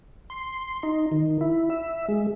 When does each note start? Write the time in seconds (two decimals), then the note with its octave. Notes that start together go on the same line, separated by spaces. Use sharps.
0.30 C6
0.83 D#4
1.12 D#3
1.41 E4
1.70 E5
2.09 G#3